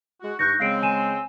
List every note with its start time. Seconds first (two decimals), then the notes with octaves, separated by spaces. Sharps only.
0.22 G#3 F#4
0.39 G2 D#4 C#6 F#6 G6 A#6
0.60 C#3 G#3 C4 F5 C7 D7
0.82 G#5 D#7 E7